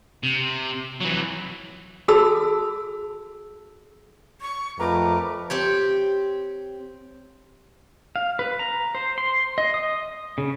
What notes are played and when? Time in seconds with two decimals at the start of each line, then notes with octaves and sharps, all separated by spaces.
0.23 C3
1.00 E3 F#3
2.08 F#4 G#4 A4 A5 B5 E6
4.41 C#6
4.80 F2 A3 A#4 B4 A#5 D6
5.50 C4 G4 C#5
8.16 F5
8.39 B4
8.59 A#5
8.95 C5
9.18 C6
9.58 D#5
9.74 D#6
10.38 C#3